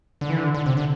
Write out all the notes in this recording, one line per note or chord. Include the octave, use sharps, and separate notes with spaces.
D3
E3
D3
D3
C3
D3